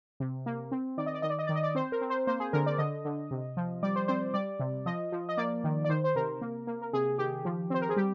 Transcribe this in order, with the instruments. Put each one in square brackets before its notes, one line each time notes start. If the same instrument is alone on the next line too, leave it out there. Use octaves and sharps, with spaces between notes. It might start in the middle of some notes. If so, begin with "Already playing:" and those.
[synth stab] C3
A#3
C4
D#3 D5
D#5
D5
D#3 D#5
D5
D#5
D#3 D5
D#5
D5
C4 C5
A#4
C4
C5
A#3 C5
G#4
D3 A#4
D5
D3 D#5
D3
C3
F3
G3 D5
C5
C4 C5
G3 D5
C3
F3 D#5
F3
D#5
A#3 D5
D#3
D5
D#3 C5
C5
C3 A#4
A#3
A#3
A#4
C3 G#4
D#3 G4
F3
C4 C5
A#4
G#4
G3 G4